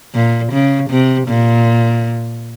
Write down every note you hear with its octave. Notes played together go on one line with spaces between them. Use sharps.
A#2
C#3
C3
A#2